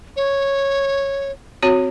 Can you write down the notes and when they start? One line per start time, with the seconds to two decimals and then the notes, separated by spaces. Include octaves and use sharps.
0.16 C#5
1.63 C4 F#4 C#5